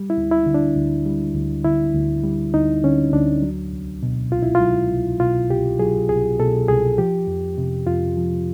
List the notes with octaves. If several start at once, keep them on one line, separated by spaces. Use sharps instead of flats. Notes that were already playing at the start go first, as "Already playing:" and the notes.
Already playing: G3
E4
D2
E4
D3
D4
D2
G3
D2
D3 E4
D2
G3
D2 D#4
D3 C#4
D2 D4
F#3
C2
B2
C2 F4
E4
F4
F#3
C2
B2 F4
C2 G4
F#3 G#4
C2 G#4
B2 A4
C2 G#4
F3 G4
F2
C3
F2 F4
F3